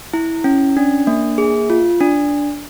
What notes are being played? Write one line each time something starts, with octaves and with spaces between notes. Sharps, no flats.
E4
C#4
D4
A#3
G#4
F4
D4